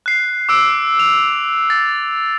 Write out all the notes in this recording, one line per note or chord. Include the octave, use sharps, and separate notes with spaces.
F#6 C7
D6 E6 D7
F7
A6